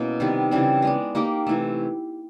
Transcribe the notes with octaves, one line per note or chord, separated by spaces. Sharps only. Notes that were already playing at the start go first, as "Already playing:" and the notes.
Already playing: B2 A#3 C#4 E4
C3 D#3 G3 B3
C#3 E3 G3 C4
G#3 B3 D4
A#3 D#4 G4 A#4
C3 E3 A3